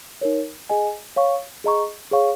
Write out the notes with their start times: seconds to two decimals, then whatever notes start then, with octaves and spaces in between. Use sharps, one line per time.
0.21 D#4 A#4 C#5
0.69 G#4 D#5 G#5
1.16 C#5 F5 C#6
1.64 G#4 D#5 A#5 C#6
2.11 G#4 C#5 F5 C#6